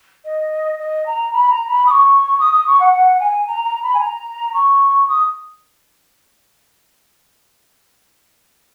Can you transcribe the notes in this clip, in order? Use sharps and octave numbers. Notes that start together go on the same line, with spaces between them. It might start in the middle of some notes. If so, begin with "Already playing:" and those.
D#5
D#5
A#5
B5
A#5
B5
D#6
C#6
D#6
D#6
C#6
F#5
F#5
G#5
A#5
A#5
B5
G#5
A#5
C#6
D#6